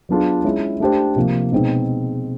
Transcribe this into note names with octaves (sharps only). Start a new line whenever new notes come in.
F#3 B3 D4 F4 G#4
G#3 C#4 E4
A3 D4 G4 C5
C3 F3 A#3
B2 G#3 C4 D#4